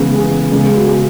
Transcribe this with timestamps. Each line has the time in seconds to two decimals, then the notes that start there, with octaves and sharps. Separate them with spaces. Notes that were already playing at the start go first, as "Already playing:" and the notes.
Already playing: C#3 E3 G#3 B3
0.16 G#4
0.51 C#3 G#3 B3
0.76 F#4
0.87 G#4